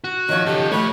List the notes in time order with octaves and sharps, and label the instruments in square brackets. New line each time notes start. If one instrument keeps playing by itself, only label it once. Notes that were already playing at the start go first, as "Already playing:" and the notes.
[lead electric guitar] F#4
[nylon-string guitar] D#3 F3 [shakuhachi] C#5
[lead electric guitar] C#3 A4 [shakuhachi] G4
[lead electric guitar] A2 A3 [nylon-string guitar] C#5 [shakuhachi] B5